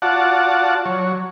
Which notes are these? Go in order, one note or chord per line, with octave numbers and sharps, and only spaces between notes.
F4 F#4 D5 F#5 A5
F#3 C#5